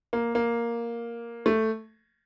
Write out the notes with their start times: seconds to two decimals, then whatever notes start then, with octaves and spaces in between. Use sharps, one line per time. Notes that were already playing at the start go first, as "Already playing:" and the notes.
0.13 A#3
0.35 A#3
1.46 A3